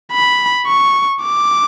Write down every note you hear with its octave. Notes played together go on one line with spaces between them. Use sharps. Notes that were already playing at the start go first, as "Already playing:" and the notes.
B5
C#6
D6